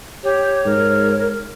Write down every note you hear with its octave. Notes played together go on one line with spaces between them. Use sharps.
G4 C#5
G#2 A#4